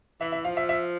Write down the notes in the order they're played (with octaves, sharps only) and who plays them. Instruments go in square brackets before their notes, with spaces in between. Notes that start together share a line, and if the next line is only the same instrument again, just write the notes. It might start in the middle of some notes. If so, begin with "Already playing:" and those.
[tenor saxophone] E3 [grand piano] E5
[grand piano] E5
[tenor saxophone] F3 [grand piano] F5
[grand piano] E5
E5